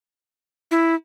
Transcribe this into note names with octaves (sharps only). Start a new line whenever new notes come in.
E4